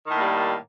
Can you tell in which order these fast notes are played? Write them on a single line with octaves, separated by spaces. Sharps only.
D#3 A2 A#3 G3